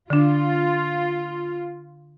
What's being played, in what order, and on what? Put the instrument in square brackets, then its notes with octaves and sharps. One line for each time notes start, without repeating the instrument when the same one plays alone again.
[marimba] D3 D4 [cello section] F4